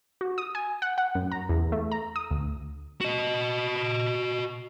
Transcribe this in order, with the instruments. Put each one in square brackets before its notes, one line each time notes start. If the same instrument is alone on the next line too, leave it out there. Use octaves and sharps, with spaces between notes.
[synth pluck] F#4
D#6
G#5
F#5
F#5
F#2
A#5
E2
A3
A#5
D#6
D2
[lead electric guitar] F#4 D#5